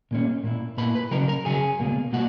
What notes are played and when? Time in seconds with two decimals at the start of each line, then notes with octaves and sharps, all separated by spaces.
0.11 A#2 A#3 C#4
0.43 A#2 A#3 E4
0.77 A#2 A#3 E4 B4 B5
0.94 B4 B5
1.11 C#3 F#3 C#4 A#4 A#5
1.28 A#4 A#5
1.45 C#3 F#3 C#4 G#4 G#5
1.80 C#2 B2 A#3
2.13 B2 A#3 F#4 F#5